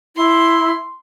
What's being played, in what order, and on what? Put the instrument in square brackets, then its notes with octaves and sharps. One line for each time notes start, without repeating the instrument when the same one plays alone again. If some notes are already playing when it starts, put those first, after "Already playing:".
[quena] E4 [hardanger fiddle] C6